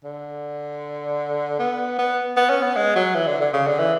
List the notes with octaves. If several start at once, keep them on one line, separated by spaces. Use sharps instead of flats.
D3
B3
B3
B3
C#4
B3
G#3
F#3
E3
D3
D3
C#3
D3
E3